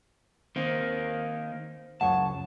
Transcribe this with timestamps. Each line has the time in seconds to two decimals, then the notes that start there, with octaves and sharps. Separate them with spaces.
0.56 D#3 A#3 C4
2.01 C#2 F#2 C#5 F#5 A5